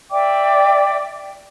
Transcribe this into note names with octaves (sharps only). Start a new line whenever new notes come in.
D5 E5 G5 D6